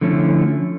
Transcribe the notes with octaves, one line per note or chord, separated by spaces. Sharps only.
D3 F3 A3 C#4 E4